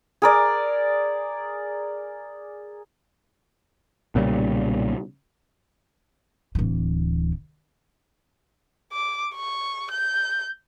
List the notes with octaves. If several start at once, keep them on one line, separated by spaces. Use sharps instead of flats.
G#4 A#4 D5
B1 A#2 C#3 G3
D1 E3
D6
C#6
G6